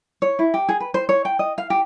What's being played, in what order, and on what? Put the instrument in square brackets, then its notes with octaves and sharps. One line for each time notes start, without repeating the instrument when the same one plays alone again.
[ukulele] C#5
E4
G4
G#4
B4
C5
C#5
G5
D#5
F5
G4